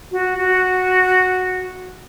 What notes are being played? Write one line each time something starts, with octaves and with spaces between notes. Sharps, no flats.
F#4
F#4